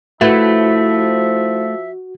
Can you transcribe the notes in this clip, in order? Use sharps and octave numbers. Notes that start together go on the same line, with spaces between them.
F3 A3 E4 F#4 B4 E5